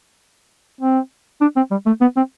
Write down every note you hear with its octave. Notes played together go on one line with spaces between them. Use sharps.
C4
D4
C4
G3
A3
B3
C4